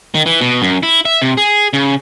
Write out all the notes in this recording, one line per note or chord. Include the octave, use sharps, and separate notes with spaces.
D#3
E3
B2
F#2
E4
E5
C3
G#4
C#3